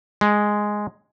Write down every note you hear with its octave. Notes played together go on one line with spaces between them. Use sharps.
G#3